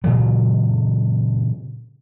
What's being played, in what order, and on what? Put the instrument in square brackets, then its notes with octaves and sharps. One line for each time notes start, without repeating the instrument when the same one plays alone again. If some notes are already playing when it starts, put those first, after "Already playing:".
[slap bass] A#2 C#3 E3 F#3